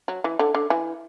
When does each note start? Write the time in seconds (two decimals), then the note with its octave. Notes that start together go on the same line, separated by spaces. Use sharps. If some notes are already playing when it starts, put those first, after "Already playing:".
0.08 F#3
0.24 E3
0.39 D3
0.55 D3
0.70 E3